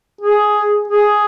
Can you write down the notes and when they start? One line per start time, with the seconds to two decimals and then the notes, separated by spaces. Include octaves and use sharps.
0.21 G#4
0.88 G#4